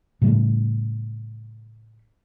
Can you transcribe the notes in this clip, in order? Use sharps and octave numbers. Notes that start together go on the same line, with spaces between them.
A2 C#3 G3 A3